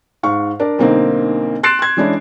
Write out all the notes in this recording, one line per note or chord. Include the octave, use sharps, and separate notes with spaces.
G#2 F5 C#6
D4 A#4 D5
B1 D3 A#3 C4 D#4
C6 F#6 A6 C7 D7 E7
C6 G#6
E3 G#3 C#4 D4 E4